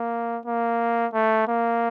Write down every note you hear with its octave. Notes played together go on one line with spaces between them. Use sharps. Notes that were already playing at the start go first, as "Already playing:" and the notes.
Already playing: A#3
A#3
A3
A#3